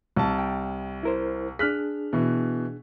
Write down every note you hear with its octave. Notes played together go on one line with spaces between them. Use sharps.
C2 A5
G5
E4 A#4 C5
D4 G#4 F6 F#6 B6
B2 E3